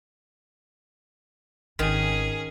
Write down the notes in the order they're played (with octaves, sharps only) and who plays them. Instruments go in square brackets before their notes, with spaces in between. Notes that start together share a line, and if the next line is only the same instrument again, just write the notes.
[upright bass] G#1 F4 [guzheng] D#3 [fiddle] C#4 G#4